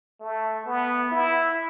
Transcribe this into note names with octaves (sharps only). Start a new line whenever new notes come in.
A3
B3
E4